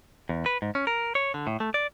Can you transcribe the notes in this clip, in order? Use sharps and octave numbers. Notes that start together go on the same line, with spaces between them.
E2
B4
G#2
C#4
A#4
C#5
D3
A2
A3
D5